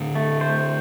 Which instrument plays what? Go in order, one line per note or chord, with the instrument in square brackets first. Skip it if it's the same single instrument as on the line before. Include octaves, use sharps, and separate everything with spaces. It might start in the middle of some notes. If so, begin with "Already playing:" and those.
Already playing: [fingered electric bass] A2 D3
[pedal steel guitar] A3
C5